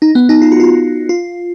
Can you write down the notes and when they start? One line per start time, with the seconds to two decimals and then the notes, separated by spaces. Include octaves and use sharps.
0.02 D#4
0.15 B3
0.29 D#4
0.42 F4
0.52 F#4
0.60 F4
1.09 F4